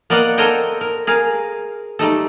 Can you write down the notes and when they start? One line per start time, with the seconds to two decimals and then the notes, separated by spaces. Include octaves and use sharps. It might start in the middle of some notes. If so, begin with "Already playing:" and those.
0.10 A#3 B3 D5 D#5 F5 F#5
0.38 A4 A#4 C5 C#5 D#5 G5
0.81 A#4
1.07 G#4 A#4 F5
1.99 G3 A3 D#4 A4